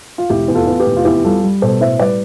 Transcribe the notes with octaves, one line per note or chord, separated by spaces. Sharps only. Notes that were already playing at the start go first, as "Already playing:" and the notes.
F4
F1 E4 G4
E2
F4 A4
E2
G4 B4
F1
F4
E2 E4 G4
G3 F4 A4
G3
B2 A4 C5
A2 C5 E5
G3 B4 D5